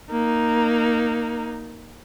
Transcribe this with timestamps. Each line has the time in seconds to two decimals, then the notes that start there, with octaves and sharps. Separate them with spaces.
0.11 A#3 D#4